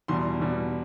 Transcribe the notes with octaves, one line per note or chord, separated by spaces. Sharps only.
E2 B2 G3 C6
E2 B2 G3